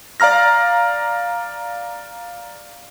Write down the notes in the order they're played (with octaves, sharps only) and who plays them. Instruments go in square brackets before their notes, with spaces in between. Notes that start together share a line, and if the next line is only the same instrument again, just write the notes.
[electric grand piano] D5 F5 A#5 F6 A#6